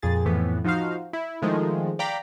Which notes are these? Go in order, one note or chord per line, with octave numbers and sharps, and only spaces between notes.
F2 A#2 G#4 A6
F2 A2 E3 B3
F3 D#4 F#4 C5 F5
E4
D#3 F3 G#3 A3
D5 F5 G5 A#5 B5